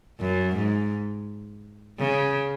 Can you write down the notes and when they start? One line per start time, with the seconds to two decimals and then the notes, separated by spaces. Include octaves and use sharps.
0.20 F#2
0.55 G#2
1.99 C#3